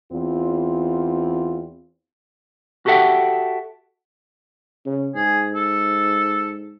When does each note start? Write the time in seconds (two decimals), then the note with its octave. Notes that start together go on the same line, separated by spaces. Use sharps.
0.12 E2 C4 F4
2.86 F#4 G4 A4 E5 F#5 G5
4.86 C#3
5.15 G#2 G#4
5.55 A4